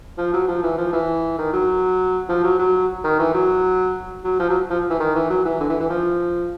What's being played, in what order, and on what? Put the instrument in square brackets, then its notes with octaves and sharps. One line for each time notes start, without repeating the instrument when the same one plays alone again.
[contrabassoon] F3
F#3
F3
E3
F3
E3
D#3
F#3
F3
F#3
F#3
D#3
E3
F#3
F#3
F3
F#3
F3
E3
D#3
E3
F#3
E3
D3
E3
E3
F3